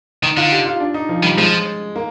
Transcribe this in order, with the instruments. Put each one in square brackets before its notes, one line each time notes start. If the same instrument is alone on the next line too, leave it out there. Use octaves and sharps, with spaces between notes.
[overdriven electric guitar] D#3 [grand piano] D#4
[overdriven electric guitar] D3 [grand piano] F4
[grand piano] G4
F4
D4
D#4
F3
[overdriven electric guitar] D#3 [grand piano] G3
[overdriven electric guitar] F3 [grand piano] G#3
[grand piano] A#3